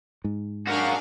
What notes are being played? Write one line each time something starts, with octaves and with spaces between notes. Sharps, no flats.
G#2
D4 F#4 G#4 A#4 F5